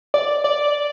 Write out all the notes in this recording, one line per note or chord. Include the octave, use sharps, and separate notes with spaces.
D5
D5